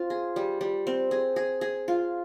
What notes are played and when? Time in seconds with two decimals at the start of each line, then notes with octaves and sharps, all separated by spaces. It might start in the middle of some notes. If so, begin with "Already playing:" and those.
Already playing: C4 F4
0.10 G#4
0.36 G3
0.61 G3
0.87 C4
1.11 G#4
1.36 G#4
1.61 G#4
1.88 F4